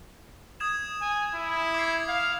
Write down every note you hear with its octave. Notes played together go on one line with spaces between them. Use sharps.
D#6 G#6 E7
G#5
E4
D6 G#6 C7
F5